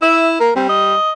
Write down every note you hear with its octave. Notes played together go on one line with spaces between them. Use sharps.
E4 E5
A#3 A#4
G3 C4
D#5